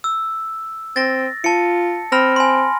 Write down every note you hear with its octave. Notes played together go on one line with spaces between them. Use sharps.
E6
C4 A6 A#6
F4 A5 C#7
C4 B5 F6 A#6
G#5 C6